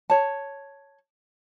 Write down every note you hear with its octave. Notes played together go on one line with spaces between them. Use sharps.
C#5 A5